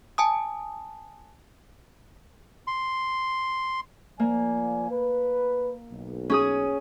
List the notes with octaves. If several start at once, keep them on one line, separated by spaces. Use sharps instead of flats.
G#5 A5 D#6
C6
F3 A#3 D5 G#5
B4
B1
C#4 G#4 D#6